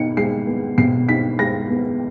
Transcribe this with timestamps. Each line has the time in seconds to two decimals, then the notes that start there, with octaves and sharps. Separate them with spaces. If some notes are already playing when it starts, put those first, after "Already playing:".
Already playing: B2 D#4 C#7
0.17 G#3 C7
0.47 B3
0.78 B2 C7
1.08 D#4 B6
1.39 G#3 A#6
1.69 B3